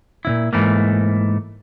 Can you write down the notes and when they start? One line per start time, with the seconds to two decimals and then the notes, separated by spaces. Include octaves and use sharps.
0.25 A#2 C#3 E4
0.53 G#2 B2 E3 A3 A#3